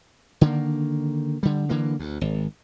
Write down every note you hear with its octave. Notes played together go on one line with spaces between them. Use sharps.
D3 D#3 A#3
D3 G3
D3 E3 A#3
D2
G#1